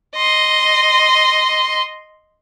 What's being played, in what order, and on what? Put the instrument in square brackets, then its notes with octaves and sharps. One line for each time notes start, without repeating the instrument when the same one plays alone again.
[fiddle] D#5 C6